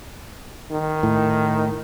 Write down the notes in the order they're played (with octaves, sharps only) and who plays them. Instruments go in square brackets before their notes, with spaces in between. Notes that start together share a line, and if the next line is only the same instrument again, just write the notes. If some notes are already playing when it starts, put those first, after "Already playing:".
[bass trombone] D#3
[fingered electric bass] A2